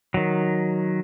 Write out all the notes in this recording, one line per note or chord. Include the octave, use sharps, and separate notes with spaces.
D#3 F#3